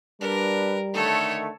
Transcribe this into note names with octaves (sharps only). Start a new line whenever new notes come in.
G3 D4 A#4 B4
D3 D#3 A3 A4 C#5